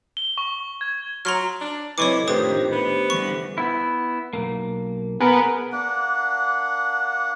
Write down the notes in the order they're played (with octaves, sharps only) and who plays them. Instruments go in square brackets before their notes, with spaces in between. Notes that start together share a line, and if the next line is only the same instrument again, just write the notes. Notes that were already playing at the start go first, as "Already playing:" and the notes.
[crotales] G7
C#6
G#6
[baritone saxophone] F#3 [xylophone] A#5 C6 F6
[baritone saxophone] D4
[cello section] C3 F#3 [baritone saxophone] E3 [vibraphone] A4 D#5 [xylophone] C#5 C#6 D6
[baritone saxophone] F2 [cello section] A2 D#3 [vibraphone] D4 G4 C5 [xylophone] B4 D#6
[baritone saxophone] B3
[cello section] D3 E3 G3 [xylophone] C#6
[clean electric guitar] B3 E4
B1 F#2 A#3
[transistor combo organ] B3 [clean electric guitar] G#4 A#4
[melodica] A#3 D4 F#5